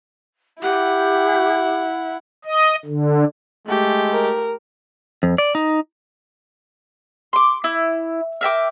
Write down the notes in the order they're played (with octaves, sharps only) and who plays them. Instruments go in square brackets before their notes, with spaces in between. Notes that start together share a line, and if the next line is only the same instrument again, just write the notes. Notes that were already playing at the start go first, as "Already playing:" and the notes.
[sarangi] E4 [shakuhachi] G4 [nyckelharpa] F#5
[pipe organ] D#5
D3
[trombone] G#3 [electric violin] A3 G4
[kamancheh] A#4
[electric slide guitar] F2
D5
D#4
[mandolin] C6 D6
E4
A#4 E5 G5 D6